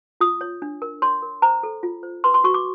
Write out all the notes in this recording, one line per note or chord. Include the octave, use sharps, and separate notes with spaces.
F4 D#6
C#5
D4
A#4
C#5 C6
A#4
C5 A#5
A4
F4
C5
B4 C6
C6
F#4 C#6
D6